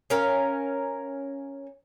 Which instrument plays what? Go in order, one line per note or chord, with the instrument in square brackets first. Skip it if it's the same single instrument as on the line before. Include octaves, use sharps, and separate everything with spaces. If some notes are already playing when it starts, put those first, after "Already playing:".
[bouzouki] C#4 A#4 F5